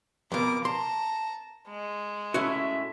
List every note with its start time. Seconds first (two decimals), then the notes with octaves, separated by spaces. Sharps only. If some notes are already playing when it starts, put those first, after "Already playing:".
0.32 F2 B2 A#4 D6
0.65 A5 A#5 C6
1.68 G#3
2.34 A2 C#4 F#4 E5